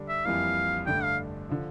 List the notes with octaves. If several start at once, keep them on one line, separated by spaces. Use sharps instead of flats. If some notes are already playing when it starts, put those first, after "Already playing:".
Already playing: D3 G3 D4
E5
F2 E3 G3 A#3 E4 F5
G2 D3 A3 D4 G5
F5
D3 F3